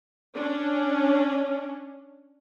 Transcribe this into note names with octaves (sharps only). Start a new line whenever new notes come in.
C#4 D4